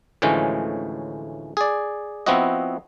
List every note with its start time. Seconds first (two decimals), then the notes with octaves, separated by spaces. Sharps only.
0.22 D2 A2 E3 F3 G#3 C#4
1.57 G#4 D5
2.26 F3 B3 C4 E4 F#4 D#5